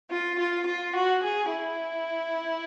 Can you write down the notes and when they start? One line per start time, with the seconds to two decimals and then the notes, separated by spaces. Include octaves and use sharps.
0.11 F4
0.39 F4
0.67 F4
0.95 F#4
1.23 G#4
1.51 E4